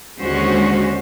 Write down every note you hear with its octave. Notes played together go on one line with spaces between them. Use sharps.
D#2 D3 G#3 C#4 F#4 C5